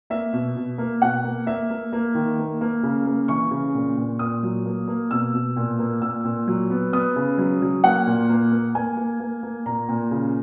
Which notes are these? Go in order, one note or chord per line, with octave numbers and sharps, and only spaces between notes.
A#3 E5
B2
B2
A#3
B2 F#5
A#3
A#3 E5
A#3
A#3
D#3
A#3
A#3
C#3
A#3
E3 C#6
C#3
A#2
A#2
A#2 D#6
F#3
A#3
A#3
B2 E6
B2
A#2
A#3
A#2 E6
A#2
F#3
B3
B3 D#6
C#3
F#3
F#3
A#3 F#5
A#2
A#3
A#3
A#3 G#5
A#3
A#3
A#3
A#2 A#5
A#2
C#3